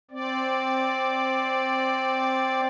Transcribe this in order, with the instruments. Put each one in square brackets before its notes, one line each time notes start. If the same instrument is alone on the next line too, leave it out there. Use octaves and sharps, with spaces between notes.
[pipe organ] C4 D5